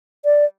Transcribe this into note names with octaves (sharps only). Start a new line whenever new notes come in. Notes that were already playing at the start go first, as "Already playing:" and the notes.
D5